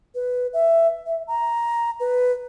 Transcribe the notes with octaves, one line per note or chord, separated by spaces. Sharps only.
B4
E5
E5
A#5
B4